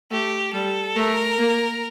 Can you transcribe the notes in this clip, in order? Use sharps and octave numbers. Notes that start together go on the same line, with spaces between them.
A3 G4
G3 A4
A3 A#4
A#3